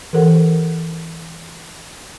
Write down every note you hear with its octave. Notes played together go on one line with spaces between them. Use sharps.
E3 G4 A4 A#4 C5 F#5